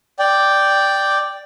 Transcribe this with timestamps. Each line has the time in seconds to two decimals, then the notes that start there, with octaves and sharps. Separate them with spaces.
0.19 D5 G5